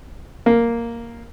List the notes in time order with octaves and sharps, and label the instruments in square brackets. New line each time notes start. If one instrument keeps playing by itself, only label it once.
[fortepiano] A#3